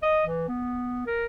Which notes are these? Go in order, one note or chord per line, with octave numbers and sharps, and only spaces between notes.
D#5
E3
B3
A#4